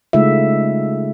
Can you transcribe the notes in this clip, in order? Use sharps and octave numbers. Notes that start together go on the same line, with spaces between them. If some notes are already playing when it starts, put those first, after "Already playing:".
C#3 G#3 A3 D#4 F4 E5